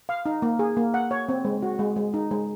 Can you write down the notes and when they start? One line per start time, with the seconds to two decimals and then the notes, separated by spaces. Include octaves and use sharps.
0.09 F5
0.26 D#4
0.42 A#3
0.59 G#4
0.77 A#3
0.94 F#5
1.11 C#5
1.29 C4
1.45 G#3
1.63 F#4
1.79 G#3
1.96 G#3
2.14 D#4
2.31 G#3